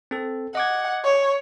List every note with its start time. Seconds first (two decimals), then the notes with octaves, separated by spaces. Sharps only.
0.11 C4 A4
0.55 D#5 F#5 D6 G#6
1.04 C#5